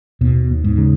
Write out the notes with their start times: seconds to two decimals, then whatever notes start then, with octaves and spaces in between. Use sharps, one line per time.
0.21 D#2 B2
0.51 D#2
0.64 G#2
0.78 C#3